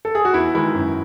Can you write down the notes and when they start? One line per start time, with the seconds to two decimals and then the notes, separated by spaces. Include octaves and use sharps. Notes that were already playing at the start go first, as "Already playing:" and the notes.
0.05 A4
0.15 G#4
0.25 F#4
0.33 E2 E4
0.54 D#3 G#3 E4
0.75 F#2